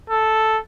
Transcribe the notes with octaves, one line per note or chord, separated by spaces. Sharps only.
A4